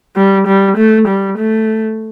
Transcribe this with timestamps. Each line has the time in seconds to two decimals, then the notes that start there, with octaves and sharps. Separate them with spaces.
0.16 G3
0.47 G3
0.77 A3
1.08 G3
1.38 A3